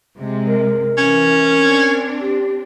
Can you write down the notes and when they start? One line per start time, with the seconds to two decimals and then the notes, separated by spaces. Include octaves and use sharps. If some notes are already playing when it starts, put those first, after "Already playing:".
0.18 C3 G#3
0.47 A#4
0.98 E3 C#4
1.59 C4 D4
2.21 G4